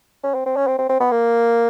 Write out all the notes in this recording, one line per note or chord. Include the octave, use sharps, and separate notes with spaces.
C#4
C4
C4
C#4
C4
C4
C4
B3
A#3